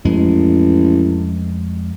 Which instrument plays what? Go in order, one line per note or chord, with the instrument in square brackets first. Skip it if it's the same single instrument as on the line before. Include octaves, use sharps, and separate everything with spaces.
[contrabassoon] A1 [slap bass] F2 G#3